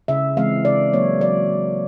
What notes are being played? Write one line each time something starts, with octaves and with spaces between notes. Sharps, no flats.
C#3 E5
E3 G#3 C4 F5
C#3 D5
F#3 A#3 C#5
F#3 D5